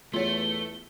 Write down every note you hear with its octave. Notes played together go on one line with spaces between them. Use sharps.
E2 A3 F4 C#5 G7